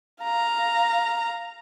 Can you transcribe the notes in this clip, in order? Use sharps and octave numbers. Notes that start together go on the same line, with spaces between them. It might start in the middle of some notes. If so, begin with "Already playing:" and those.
F5 A#5